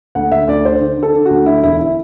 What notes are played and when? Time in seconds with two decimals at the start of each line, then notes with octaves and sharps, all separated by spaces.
0.15 D2 F#5
0.31 D2 E5
0.48 D2 D5
0.65 D3 C5
0.81 D3
0.97 D3
1.03 A4
1.14 D3
1.25 F#4
1.31 D2
1.46 D3 E4
1.63 E1 E4
1.79 E4